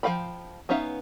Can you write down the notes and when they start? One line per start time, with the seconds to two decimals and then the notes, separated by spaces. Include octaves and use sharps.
0.03 F3 F#4 F5 G5 B5
0.69 B3 C#4 D#4 E5 F5